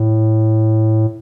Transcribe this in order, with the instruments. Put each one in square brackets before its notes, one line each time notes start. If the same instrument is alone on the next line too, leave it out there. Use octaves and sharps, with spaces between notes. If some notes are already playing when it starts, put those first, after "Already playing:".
Already playing: [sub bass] A2